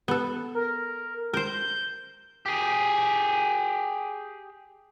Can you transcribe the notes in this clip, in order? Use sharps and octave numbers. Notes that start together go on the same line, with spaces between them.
B3 A4
A#4
A#4 C5 G6
G4 G#4